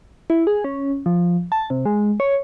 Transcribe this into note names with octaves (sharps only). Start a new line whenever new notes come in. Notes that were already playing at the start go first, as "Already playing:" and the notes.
E4
G#4
C#4
F3
A5
C3
G#3
C#5